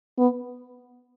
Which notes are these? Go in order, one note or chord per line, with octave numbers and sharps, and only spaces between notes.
B3